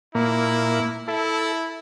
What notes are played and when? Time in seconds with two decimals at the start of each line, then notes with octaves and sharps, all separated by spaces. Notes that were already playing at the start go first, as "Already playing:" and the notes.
0.15 A#2 A#3 E4
1.08 E4 A4